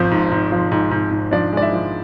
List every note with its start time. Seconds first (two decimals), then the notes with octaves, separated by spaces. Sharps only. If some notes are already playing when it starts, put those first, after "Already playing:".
Already playing: G#1 F3 C4 C5
0.11 G#2
0.31 G#2
0.52 F3
0.72 G#2
0.91 G#2
1.11 G#2
1.31 F3 D4 D5
1.53 G#3 D5
1.62 E4 E5
1.73 F3